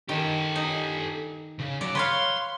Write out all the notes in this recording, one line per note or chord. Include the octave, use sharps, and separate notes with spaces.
D#3 G4 A4
D#4
C#3
F#3 D5
B4 C#5 F5 C6